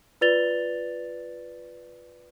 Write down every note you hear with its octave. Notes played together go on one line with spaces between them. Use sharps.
F4 B4 D5 A6 F7 G7